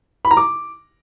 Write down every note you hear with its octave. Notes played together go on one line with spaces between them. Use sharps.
B5
A#5
D6